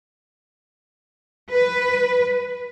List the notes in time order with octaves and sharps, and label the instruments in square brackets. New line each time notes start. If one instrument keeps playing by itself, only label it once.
[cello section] B4